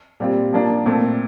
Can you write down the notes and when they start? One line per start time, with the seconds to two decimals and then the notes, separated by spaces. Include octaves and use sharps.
0.20 A#2 G3 C4 F4
0.53 F3 A#3 D4 F4
0.86 A#2 A3 C4